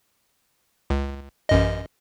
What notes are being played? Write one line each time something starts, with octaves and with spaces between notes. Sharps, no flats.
C#2
A1 F#2 D#5